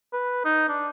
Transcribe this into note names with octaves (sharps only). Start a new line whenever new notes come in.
B4
D#4
D4